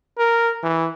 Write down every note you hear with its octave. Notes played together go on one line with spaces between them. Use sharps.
A#4
E3